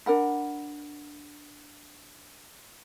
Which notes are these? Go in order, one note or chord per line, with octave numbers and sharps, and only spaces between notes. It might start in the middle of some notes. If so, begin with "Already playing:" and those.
D4 A#4 F#5 B5